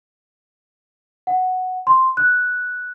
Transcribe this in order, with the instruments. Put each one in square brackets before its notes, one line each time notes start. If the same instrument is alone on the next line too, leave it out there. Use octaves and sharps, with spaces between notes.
[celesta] F#5
C6
F#6